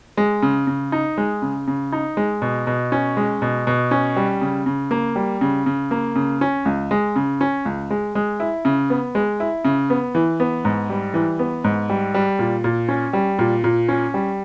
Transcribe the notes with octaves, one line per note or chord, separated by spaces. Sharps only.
G#3
C#3
C#3
D#4
G#3
C#3
C#3
D#4
G#3
B2
B2
C#4
G#3
B2
B2
C#4
G3
C#3
C#3
A#3
G3
C#3
C#3
A#3
C#3
C#4
C#2
G#3
C#3
C#4
C#2
G#3
G#3
E4
C#3
B3
G#3
E4
C#3
B3
E3
B3
G#2
G3
E3
B3
G#2
G3
G3
A#2
A#2
C#4
G3
A#2
A#2
C#4
G3